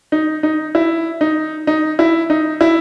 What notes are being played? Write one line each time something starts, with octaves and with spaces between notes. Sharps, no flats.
D#4
D#4
E4
D#4
D#4
E4
D#4
E4